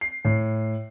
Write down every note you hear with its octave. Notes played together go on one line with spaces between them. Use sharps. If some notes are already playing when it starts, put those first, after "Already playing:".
C7
A2